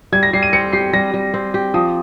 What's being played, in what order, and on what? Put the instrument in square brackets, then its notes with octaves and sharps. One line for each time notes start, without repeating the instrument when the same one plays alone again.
[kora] G3 [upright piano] G#6
[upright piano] A#6
[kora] G3 [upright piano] C7
[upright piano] D#7
[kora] C4 [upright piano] C#7
[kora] G4 [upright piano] C7
[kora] G3 [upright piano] A#6
[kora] G3
C4
G4
[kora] F3 [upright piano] D#6